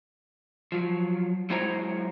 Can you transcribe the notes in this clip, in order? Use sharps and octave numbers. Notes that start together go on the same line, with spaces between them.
F3 F#3
F#3 G#3 E4 C5 C#5 A#5